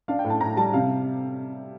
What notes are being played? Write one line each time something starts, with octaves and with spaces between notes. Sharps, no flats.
D4 F5
G5
A2
A5
A2 A#5
G3 A5
C3 F5